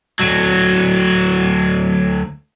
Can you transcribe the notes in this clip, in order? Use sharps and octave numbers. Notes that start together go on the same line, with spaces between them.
D2 F#3